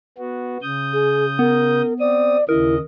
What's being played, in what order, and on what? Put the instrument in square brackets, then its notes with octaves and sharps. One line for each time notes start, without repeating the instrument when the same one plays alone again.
[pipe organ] B3 F#4
C#3 D#6 G6
[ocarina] G#4
[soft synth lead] B3 [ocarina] A#4
[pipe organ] C4 D#6 [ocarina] D5
[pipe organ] D#2 C#3 D#5 [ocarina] E4 [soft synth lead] A#4